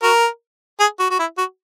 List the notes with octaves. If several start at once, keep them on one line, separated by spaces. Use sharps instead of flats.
F#4 A#4
G#4
F#4
F#4
E4
F#4